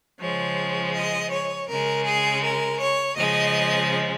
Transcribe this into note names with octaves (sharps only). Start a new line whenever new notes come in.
C#3 F3 G#3 C#5
D#5
C#5
C#3 G#3 A#4
G#4
A#4
C#5
C#3 F3 G#3 D#5